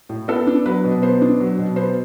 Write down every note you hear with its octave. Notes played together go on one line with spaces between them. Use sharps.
A2
B3 A4
D4
F#3 B4
B2
B3 C5
D4
F#3
B2
B3 C5